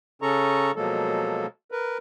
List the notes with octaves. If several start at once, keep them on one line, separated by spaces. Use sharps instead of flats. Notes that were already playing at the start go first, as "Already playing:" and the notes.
C#3 C#4 A4 A#5 C#6
B2 F3 F#3 G#3 A#3 A4
A#4 B4